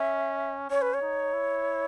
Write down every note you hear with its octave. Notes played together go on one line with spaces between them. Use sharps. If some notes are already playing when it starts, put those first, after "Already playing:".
Already playing: C#4 E5
C#4 C#5
B4
C#5
D#4
E4